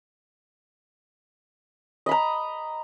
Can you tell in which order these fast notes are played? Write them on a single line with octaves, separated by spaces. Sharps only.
D#5 B5 A#5